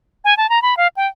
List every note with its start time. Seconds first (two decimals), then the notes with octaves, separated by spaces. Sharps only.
0.24 G#5
0.37 A5
0.49 A#5
0.62 B5
0.77 F5
0.96 G5